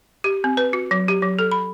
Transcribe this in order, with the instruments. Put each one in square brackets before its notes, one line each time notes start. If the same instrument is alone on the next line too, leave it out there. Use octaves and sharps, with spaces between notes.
[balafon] G4
C4
B4
F#4
F#3
G4
F#3
A4
B5